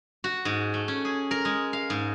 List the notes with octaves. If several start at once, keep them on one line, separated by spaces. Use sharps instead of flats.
F#4
G#2
A3
C#4
G#4
A#4
G#3
F5
G#2